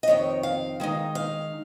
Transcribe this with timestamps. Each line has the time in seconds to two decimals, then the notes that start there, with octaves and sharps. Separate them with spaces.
0.03 D#5
0.07 F2 C3 D#3 C#5
0.43 F5
0.80 D#3 G#3 D#4
1.15 F5